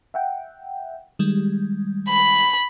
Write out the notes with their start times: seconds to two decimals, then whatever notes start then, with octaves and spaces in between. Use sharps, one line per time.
0.14 E5 F#5 G5
1.19 D#3 G3 G#3
2.09 B5